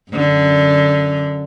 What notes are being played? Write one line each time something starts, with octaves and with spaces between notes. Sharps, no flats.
F#2 D3